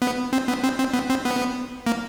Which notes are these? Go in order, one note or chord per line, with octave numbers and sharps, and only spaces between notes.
B3
C4
B3
C4
C4
B3
C4
B3
A#3